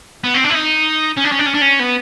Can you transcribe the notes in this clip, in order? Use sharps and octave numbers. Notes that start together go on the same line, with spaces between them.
B3
C4
D4
E4
D#4
C#4
D4
C#4
D4
C#4
D4
C#4
B3